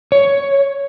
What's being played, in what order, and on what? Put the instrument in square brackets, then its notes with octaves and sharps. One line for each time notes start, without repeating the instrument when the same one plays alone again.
[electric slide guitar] C#5